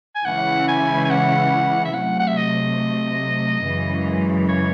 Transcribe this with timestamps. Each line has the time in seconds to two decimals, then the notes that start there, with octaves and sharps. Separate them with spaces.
0.15 G#5
0.25 C#3 E3 G#3 C#4 E4 F#5
0.68 G#5
1.04 G#5
1.10 F#5
1.85 E5
1.94 C3 F#3 A3 F#5
2.19 F#5
2.27 E5
2.37 D#5
3.64 F#2 C#3 E3 G#3
4.49 C#5